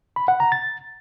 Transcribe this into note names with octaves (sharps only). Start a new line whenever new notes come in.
B5
F#5
A#5
A6